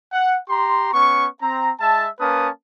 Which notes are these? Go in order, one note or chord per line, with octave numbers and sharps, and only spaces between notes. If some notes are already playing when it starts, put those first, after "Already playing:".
F#5
G4 A#5 C6
B3 C#4 C#6
C4 A#5
G#3 E5 A5
A#3 C#4 B4 A5 D#6